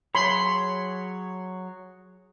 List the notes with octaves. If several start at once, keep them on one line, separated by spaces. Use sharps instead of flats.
F#3 G#4 C#5 B5 C6